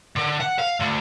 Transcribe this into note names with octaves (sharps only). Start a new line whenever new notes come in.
D3
F#5
F5
D2